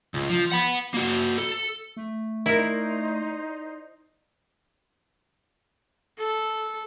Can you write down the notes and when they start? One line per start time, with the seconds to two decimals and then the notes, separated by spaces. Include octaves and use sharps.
0.14 C#2
0.30 F3
0.52 F#5 B5
0.94 A#3 F#4
1.38 A4
1.97 A3
2.46 D#4 E4 A#4 C5 D5
6.18 A4